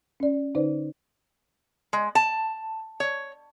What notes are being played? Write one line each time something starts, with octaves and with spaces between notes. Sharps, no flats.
C#4 D5
D3 D#4 B4 C5 D5
G#3
A5
C#5